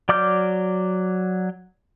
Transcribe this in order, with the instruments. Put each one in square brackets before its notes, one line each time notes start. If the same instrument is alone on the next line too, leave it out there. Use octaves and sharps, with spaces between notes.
[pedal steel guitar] F#3 D5 D6 F6 G6